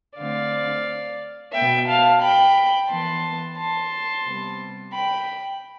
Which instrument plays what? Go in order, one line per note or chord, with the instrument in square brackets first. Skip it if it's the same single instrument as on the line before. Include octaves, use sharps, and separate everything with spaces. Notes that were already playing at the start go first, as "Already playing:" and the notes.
[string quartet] D3 A3 C4 D5 F5
B2 B3 E5 G5
F5 A5
G5 B5
E3 B3 A5 C6
A5 C6
C3 G3 B3
G5 B5